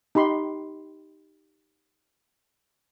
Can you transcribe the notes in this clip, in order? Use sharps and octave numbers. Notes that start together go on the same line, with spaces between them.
D#4 G4 B5 C6